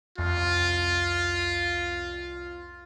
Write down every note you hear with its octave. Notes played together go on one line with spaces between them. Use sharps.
C2 F2 F4